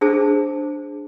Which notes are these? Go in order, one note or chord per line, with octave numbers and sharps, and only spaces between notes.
D4 G#4 C5 A5 D6